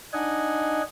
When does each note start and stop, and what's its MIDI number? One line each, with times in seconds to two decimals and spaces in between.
0.13 0.82 62
0.13 0.82 63
0.13 0.82 75
0.13 0.82 78
0.13 0.82 80